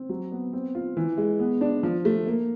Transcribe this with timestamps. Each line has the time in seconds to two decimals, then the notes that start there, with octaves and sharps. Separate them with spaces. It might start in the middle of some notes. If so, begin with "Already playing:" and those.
Already playing: C4
0.09 F#3
0.32 B3
0.53 C4
0.75 F4
0.97 E3
1.17 G#3
1.39 B3
1.61 D4
1.83 F3
2.05 A3
2.27 A#3